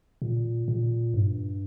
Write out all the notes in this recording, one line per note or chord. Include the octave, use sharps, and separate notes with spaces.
A#2
A#2
G2